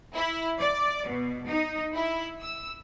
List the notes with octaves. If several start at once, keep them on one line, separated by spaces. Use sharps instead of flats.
E4
D5
B2
D#4
E4
E6